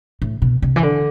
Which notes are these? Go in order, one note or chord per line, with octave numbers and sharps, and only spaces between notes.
A2
B2
C3
E3
D3